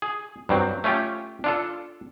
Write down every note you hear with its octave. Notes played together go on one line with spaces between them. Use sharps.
G#4
G2 F#3 C4
A3 C#4 F4 G4
D4 F4 A4